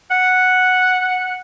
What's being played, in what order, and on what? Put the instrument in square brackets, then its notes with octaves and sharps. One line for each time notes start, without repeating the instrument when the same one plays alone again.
[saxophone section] F#5